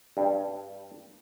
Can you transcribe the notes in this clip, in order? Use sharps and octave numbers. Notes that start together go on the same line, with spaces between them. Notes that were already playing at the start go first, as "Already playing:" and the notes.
G2